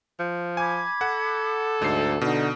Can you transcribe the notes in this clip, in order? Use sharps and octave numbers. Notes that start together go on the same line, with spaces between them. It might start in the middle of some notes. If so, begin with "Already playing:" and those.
F3
G#5 B5 D6 G#6
A4 F#5
D2 G#2 D#4 C7
B2 D3 D#4